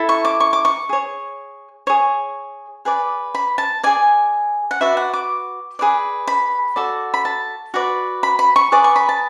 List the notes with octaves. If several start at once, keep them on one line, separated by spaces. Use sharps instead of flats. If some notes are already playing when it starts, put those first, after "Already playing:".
Already playing: E4 A4
C#6
D6
C#6
D6
C#6
G#4 C#5
G#4 C#5
G#4 B4 D5
B5
A5
G#4 D5 G#5
F#5
F#4 B4 D5 E5
F#5
D6
G#4 B4 D5
B5
F#4 A4 D5
B5
A5
F#4 B4 D5
B5
B5
C#6
G#4 B4 D5 D6
C#6
B5
A5